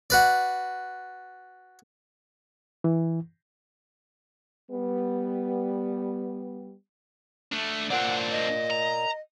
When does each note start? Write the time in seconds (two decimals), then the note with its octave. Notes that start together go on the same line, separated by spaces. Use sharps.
0.10 F#4 B4 D5
2.84 E3
4.71 G3 B3
7.52 A3 D4
7.90 C4 D4 A#4 D5 F#5
8.30 D#5
8.70 A#5